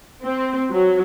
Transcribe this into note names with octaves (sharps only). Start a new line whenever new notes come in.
C4
F#3